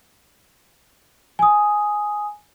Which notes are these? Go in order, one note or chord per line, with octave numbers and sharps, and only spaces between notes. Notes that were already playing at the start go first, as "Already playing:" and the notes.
G#5 D#6